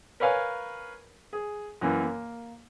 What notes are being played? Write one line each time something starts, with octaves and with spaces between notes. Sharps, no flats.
A#4 B4 C#5 F5 G#5
G#4
F#2 E3 A#3
A#3